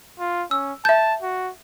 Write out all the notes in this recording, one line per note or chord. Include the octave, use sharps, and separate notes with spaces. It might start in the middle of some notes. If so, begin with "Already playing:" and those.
F4
C#4 E6
E5 A5 G6
F#4